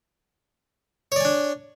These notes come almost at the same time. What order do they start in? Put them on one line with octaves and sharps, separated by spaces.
C#5 D5 G#5 D4